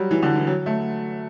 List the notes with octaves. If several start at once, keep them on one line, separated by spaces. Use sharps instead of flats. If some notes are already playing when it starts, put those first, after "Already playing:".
Already playing: F#3 G3
E3
D3
E3
F#3
A3